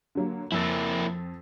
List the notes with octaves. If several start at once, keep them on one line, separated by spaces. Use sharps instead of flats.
D3 F#3 A#3
F2 A#3 E4 E6 A6